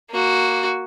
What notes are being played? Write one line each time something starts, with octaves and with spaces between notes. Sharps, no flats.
A#3 F#4